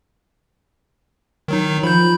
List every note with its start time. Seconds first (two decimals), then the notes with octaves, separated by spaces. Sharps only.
1.48 D#3 F#3 D#4
1.83 F3 B5 G6